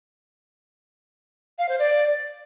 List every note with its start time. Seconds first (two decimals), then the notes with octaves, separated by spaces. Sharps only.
1.59 F5
1.69 C5
1.79 D5